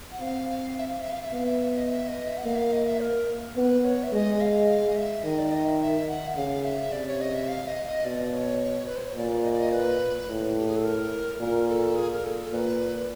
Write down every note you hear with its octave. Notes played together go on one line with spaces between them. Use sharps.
F#5
C4 F5
F5
E5
F5
E5
F5
E5
B3 F5
E5
D#5
E5
D#5
E5
F#5
A#3 F5
E5
F5
D#5
E5
A#4
B3 B4
C#5
E5
G#3 D#5
F5
F5
D#5
E5
D#3 D#5
D5
D#5
E5
E5
F#5
E5
C#3 F5
E5
C3 D5
C#5
D#5
E5
F5
D#5
D#5
B2 D5
C#5
B4
C5
C#5
A#2 D5
D#5
D5
D#5
B4
A2
G4
G#4
A4
A#4
A#2 A#4
A4
G#4
A#4
A4
A4
A#2 B4